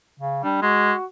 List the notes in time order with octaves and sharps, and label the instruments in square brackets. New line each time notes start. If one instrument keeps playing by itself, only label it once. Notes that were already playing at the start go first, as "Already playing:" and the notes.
[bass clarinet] C#3
[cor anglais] G3 [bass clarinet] D4
[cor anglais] G#3 [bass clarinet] F#4